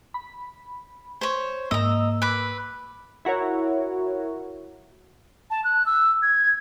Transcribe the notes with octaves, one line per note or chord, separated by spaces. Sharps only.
B5
C5 C#5
G#2 A#3 D#5 A#5 E6
B4 D6
E4 F#4 A#4 C#5
A5
F#6
E6
G#6